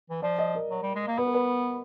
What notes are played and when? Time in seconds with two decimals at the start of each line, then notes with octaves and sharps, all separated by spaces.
0.10 E3
0.22 F3 D5
0.38 D#5
0.55 A#4
0.70 F#3
0.83 G3
0.95 G#3
1.07 A#3
1.18 B3 B4
1.27 A#4
1.34 B4